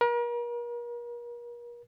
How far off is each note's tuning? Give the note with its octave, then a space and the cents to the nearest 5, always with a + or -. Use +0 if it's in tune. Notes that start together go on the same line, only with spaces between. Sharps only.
A#4 +40